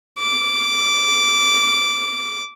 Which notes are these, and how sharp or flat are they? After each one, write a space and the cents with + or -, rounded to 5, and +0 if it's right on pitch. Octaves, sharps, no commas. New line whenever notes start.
D6 -10